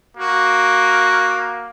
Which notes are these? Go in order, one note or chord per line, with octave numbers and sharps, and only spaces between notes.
A#3 F#4